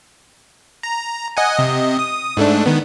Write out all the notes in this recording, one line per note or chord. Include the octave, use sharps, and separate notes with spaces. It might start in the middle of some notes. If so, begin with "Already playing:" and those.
A#5
D#5 F#5 G#5
C3 D#5
D#6
G#2 A3 D4
D#3 B3